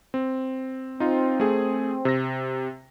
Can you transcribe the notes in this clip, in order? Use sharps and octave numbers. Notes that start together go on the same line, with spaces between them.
C4
C4 D#4 F4
A3 G#4
C3 E6 A#6